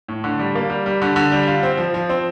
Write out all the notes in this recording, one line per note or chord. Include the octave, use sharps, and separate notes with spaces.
A2
D3
G3
A#3
G3
G3
D3
D3
G3
F4
C4
F3
F3
C4